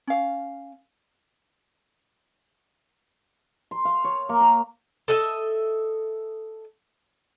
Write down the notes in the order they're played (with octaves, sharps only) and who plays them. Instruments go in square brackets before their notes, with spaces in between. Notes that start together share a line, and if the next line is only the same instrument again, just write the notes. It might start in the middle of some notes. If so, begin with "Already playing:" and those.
[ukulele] C#4 F5
[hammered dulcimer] C6
F5
C#5
A#3
A#5
[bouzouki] A4 D#5 E5